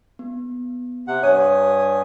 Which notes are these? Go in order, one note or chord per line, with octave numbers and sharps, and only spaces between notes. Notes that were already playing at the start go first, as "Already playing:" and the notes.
B3
C3 F#5
G2 C#5 G#5 D#6